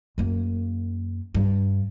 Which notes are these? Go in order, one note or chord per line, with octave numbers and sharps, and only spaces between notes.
F#2 A#3
G2